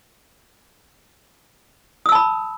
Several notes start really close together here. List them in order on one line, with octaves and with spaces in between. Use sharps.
D#6 E6 A5 B5